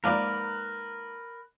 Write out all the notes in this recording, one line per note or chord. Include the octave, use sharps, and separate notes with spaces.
G#2 A#3 A#4 B4 D5